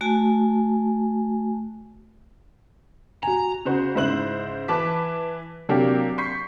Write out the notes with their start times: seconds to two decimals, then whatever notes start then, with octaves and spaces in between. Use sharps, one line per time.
0.01 A3 F#4 G#5 A5
3.23 F#4 G#5 A#5
3.65 C#3 F#4 C5
3.95 G#2 C#3 E4 C5 F#6 F#7
4.68 E3 B4 A5 D6 B6
5.69 C3 F#3 A#3 D4 G4 A#4
6.18 C6 C#6 G6 B6 C7